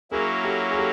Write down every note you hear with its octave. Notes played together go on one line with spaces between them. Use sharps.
F#3 A#3 C#4 E4 G#4 A#4
G4 A4
G#4
G4 A4